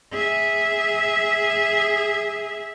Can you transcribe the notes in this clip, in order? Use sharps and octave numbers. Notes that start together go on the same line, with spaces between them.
G#4 E5